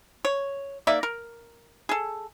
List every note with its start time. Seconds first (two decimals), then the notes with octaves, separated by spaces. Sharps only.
0.25 C#5
0.87 A#3 D#4 D5 E5
1.03 A#4
1.89 G#4 A4